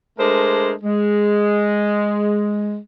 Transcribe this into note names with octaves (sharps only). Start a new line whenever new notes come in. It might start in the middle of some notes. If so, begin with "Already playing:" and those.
G#3 A3 D4 G#4 A#4 C5
G#3